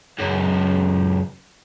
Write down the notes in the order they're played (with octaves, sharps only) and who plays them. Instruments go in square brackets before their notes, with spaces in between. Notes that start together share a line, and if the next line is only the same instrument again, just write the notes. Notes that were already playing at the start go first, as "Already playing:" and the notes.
[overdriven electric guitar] C#2 F#2